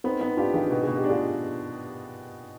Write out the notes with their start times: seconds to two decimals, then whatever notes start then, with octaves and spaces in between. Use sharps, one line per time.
0.04 B3 C4 D#4
0.21 B3 C4 D#4
0.37 D4 F4 G4
0.54 D#3 F4 G#4
0.70 B2 B4
0.83 B2 G#4
0.97 G4
1.04 D4
1.10 F4 G#4